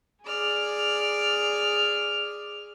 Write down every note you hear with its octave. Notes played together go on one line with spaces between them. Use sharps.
G#4 D5 F6